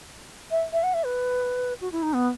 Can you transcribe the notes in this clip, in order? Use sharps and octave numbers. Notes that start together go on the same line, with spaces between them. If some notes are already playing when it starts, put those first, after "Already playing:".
E5
E5
F#5
E5
B4
F#4
E4
D#4
B3